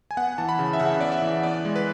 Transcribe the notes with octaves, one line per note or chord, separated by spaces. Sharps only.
G#5
B3 F#5
E3 A5
B5
C#3
E5
C#3 F#5
B3 D5
E5
E3
B3 D5
G#3
B4